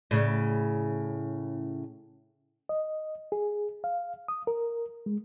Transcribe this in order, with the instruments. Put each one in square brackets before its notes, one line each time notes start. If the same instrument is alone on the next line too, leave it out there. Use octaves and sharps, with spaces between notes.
[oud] A2 C#3
[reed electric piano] D#5
G#4
F5
D#6
A#4
G#3